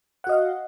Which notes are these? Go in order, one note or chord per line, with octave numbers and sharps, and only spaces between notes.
F#4 D#5 F5 F#5